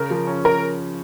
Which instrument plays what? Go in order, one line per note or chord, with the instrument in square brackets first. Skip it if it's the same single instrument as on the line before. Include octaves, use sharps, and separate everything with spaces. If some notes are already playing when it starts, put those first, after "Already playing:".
Already playing: [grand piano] C#3 [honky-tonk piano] A#4
[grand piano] F3
C#4
[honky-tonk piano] A#4